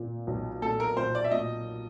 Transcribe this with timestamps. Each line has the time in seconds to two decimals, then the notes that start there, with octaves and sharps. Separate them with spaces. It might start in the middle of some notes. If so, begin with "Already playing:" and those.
Already playing: A#2
0.27 B1
0.62 A#2 A4
0.80 A#4
0.96 A#2 C5
1.15 D5
1.24 E5
1.31 A#2 D#5